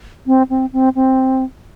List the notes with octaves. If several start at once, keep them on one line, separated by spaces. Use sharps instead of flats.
C4
C4
C4
C4